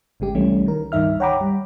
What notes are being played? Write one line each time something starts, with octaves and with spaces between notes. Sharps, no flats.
G#1 C#3 G#3 G4
C2 E3 G3 A3 C#4
D#3 A#4
C#2 G2 D#3 D#4 E5 F6
C#5 F#5 G5 A#5 B5 D6
G3